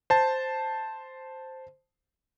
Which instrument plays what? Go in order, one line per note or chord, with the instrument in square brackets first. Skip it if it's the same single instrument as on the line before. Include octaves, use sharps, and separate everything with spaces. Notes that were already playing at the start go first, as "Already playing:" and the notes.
[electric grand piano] C5 A5